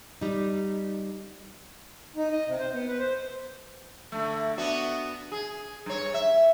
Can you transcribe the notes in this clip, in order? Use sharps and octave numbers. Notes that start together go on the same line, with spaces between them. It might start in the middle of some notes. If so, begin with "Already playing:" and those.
G3 D#4
D#4
D#5
C3
C5
B3
B4
C5
D3 A3
B3 D4 F#4
G#4
G2 C#5
E5